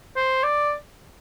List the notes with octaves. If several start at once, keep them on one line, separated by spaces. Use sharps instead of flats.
C5
D5